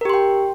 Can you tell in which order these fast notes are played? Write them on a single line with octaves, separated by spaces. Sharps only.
A#4 G4 C6 G5